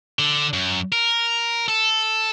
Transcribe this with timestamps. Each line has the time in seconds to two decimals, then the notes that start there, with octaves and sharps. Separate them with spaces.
0.19 D3
0.53 F#2
0.92 A#4
1.68 A4